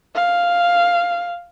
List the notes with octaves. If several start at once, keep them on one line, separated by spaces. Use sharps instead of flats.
F5